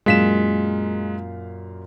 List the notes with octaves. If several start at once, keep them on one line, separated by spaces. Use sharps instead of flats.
F#2 A#2 G#3 F5 B6 E7